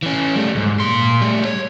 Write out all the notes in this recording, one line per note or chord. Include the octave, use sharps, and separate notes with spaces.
E3 C#4
G3 A3
C#2 G#2
A#2 C6
G3 A3
C#5